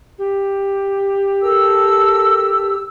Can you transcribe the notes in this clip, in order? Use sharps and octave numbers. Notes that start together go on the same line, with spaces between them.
G4
A4 A#4 E6